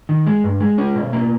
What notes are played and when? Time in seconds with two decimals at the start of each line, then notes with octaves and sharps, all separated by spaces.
0.09 D#3
0.26 G#3
0.44 G2
0.60 G#3
0.78 C#4
0.96 B2
1.13 A#3